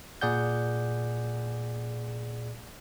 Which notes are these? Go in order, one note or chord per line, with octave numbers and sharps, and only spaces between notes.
A#2 G#4 D5 F#5 G6